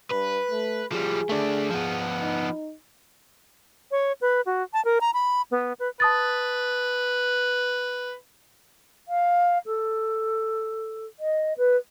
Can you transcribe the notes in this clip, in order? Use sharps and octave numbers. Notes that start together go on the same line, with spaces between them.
G2 B4
A3
F3 G3 G#4
A3 D4
F3 B3
D#4
C#5
B4
F#4
A5
A#4
A#5
B5
B3
B4
B4 A5 D#6 A6
F5
A4
D#5
B4